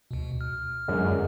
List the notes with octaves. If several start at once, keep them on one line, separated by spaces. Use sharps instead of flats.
D2 B2
F6
F#2 A#2 D3 G#3